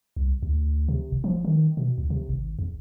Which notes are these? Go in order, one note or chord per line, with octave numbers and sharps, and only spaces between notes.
C2
D2
C3
G1
F3
D#3
B2
D2
C3
G#1
E2